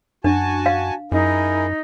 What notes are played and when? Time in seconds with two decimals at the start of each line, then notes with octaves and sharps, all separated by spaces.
0.24 F#2 D4 F#4 G#5 A5
0.66 F5
1.12 F#2 D#4 E4 G#4 A#4